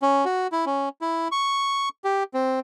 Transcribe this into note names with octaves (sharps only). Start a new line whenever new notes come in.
C#4
F#4
E4
C#4
E4
C#6
G4
C4